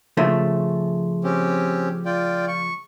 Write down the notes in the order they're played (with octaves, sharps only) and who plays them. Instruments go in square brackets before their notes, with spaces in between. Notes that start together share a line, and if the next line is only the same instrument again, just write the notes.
[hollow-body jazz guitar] C#3 F3 A3
[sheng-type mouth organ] C4 C#4 G4
F4 D5 G5
C#6